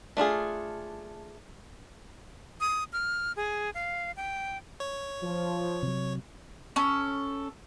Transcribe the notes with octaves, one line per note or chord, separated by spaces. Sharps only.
A3 D4 F4 G#4
D#6
F6
G#4
F5
G5
C#5
F3
C3 F#3
C#4 A4